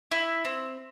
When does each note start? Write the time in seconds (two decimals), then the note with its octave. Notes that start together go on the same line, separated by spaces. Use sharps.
0.12 E4
0.45 C4